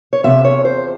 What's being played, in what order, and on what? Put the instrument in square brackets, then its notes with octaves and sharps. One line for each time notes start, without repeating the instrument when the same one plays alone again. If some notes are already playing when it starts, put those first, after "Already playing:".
[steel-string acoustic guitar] C#5
E2 C3 F3 E5
C#5
C5